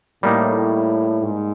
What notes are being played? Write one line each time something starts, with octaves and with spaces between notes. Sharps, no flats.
A2 G3 A#3 D#4
G#2